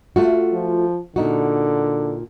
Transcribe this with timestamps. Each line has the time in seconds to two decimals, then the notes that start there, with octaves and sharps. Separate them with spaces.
0.16 A3 F4 F#4
0.53 F3
1.16 A#2 D3 D#4 F#4